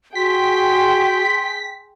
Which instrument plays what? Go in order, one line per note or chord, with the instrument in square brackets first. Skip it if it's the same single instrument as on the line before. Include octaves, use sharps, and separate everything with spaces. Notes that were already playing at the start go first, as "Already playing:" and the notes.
[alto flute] F#4 [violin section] G#4 G5 C6 [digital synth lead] B6